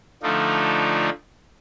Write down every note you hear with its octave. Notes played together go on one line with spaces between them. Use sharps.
D3 F3 A3 D4 D#4 F4